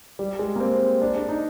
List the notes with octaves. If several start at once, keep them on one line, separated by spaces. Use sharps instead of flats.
G3
G#3
A#3
C4
D4
D4
D#4